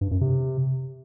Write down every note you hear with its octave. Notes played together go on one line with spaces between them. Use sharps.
G2
F#2
C3